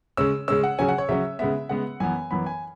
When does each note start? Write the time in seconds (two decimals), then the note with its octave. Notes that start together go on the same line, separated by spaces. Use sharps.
0.17 C#3 G#3 C#4 E6
0.48 C#3 G#3 C#4 E6
0.64 F#5
0.79 C#3 F#3 C#4 G#5
0.89 F#5
0.98 C#5
1.09 C#3 F#3 C#4 E5
1.39 C#3 G#3 B3 E5
1.69 C#3 G#3 B3 F#5
2.00 F#2 E3 B3 G#5
2.31 F#2 E3 B3 B5
2.46 G#5